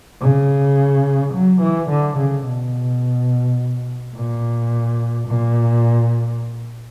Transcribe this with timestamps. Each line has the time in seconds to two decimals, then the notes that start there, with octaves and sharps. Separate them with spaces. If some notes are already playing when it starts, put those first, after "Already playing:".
0.21 C#3
1.33 F#3
1.61 E3
1.89 D3
2.18 C#3
2.46 B2
4.15 A#2
5.28 A#2